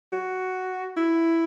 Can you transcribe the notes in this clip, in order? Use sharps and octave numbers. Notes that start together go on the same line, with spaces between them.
F#4
E4